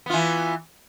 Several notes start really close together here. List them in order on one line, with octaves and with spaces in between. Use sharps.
B3 F4 E3